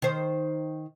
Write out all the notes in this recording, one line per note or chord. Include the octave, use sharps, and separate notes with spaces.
D#3 C5